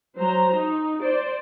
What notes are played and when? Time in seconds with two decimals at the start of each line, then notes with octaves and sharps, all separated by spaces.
0.16 F#3 C5 A#5
0.55 D#4
1.01 C5 D5